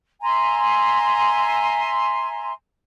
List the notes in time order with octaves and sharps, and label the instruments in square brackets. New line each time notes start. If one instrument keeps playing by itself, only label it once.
[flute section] E5 G#5 A#5 C6